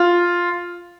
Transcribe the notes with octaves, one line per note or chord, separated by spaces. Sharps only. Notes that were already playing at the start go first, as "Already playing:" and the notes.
Already playing: F4